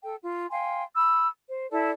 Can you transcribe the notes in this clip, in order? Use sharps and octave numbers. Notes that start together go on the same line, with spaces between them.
A4 G5
F4
F5 G5 G#5 C6
B5 E6
C5
E4 A4 D5 A5